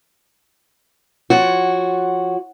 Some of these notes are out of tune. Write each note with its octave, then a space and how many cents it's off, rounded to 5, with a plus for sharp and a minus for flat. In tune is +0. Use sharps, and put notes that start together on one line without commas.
F3 +0 F#4 +0 C#5 -10